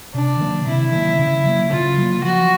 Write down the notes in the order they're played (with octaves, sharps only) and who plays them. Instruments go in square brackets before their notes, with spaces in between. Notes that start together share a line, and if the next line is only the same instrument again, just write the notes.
[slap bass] C3 [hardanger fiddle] D4
[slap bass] D#3 F#3 A#3
[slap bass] C3 [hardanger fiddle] E4
[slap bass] D#3 F#3 A#3
C#3
F#3 A#3
[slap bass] C#3 [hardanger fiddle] F4
[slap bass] F#3 A#3
[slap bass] F3 [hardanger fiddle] F#4